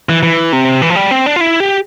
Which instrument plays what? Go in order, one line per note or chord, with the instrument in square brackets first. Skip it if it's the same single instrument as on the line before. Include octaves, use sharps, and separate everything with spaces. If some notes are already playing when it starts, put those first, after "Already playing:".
[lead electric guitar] E3
E3
C3
E3
F3
G3
C4
D4
F4
E4
G4